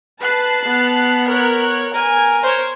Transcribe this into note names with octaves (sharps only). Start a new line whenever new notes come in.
B4 A5 F#6 C7
B3
A#4 C#5 F#6
A#4 G#5
C5 C#5